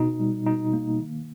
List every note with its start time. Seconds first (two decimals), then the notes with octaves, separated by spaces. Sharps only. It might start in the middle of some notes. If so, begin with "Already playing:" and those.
Already playing: B2 D#4
0.20 G3
0.46 B2 D#4
0.73 A#3
1.00 D#3